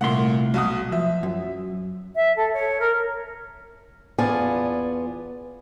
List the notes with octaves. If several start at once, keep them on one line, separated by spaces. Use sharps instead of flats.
C2 A#2 A3 F#5 C6
B1 F#4 D#6
F3 E5
F#2
E5
A4
C#5
A#4
E2 B3 F4 D5 G#5 A5